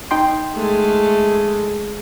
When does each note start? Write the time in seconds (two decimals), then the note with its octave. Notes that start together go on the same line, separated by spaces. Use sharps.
0.11 D#4 G5 C6
0.54 G#3 A3